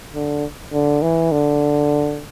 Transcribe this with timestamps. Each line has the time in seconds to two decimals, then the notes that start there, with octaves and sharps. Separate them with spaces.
0.14 D3
0.73 D3
1.02 E3
1.32 D3